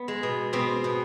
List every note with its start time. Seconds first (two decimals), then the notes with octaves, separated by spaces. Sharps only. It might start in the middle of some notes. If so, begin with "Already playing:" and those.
Already playing: B3
0.08 G#3
0.23 B2
0.53 B2 C4
0.84 B2